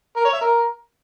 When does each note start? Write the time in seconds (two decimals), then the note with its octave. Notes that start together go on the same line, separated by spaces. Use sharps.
0.16 A#4
0.25 C#5
0.33 E5
0.41 A#4